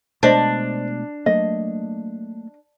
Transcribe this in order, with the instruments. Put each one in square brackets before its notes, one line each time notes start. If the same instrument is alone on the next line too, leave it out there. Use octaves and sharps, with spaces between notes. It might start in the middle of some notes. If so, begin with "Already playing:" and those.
[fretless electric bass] B2 G#3 A3 [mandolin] D4 [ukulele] C5 D5 D#5
[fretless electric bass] F#3 A3 A#3 [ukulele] D#5